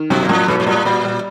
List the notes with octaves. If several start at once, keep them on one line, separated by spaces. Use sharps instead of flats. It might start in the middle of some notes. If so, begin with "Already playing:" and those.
Already playing: D#3
F#2 B2
A#2
F#2 A2
G#2 B2
G#2
A2 G3
A#2 G3
G3